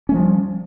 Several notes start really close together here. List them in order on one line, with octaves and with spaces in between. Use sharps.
C#4 A3 F3 G3